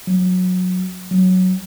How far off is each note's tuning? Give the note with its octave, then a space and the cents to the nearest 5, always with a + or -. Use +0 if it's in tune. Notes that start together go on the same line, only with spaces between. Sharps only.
F#3 -20
F#3 +0